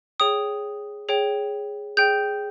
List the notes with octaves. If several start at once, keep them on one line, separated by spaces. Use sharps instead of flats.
G#4 C#5 G5 D#6
G#4 C#5 G5
G#4 C#5 G5 G6